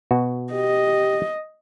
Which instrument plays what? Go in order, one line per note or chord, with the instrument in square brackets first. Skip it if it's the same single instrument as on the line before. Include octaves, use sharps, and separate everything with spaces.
[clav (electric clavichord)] B2 F#4
[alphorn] G4 [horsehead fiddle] D#5